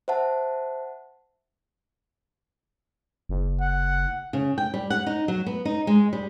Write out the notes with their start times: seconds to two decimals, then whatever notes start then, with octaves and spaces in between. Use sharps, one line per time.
0.08 C5 E5 F#5 A5
3.29 F#1
3.61 F#5
4.33 C#3
4.58 G5
4.74 G3
4.90 F#5
5.06 D#4
5.28 F#3
5.46 B3
5.65 D#4
5.87 G#3
6.13 G3